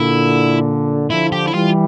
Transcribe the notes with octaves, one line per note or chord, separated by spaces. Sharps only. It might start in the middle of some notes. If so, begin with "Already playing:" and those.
Already playing: A#2 D3 E4
D3 F3 E4
G4
E4
E3 G3 F4